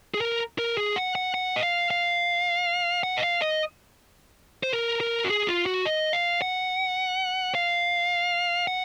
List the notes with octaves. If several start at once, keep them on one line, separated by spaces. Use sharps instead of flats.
G#4
A#4
A#4
G#4
F#5
F#5
F#5
D#5
F5
F5
F#5
D#5
F5
D#5
C5
A#4
A#4
F#4
G#4
F4
F#4
D#5
F5
F#5
F5
F#5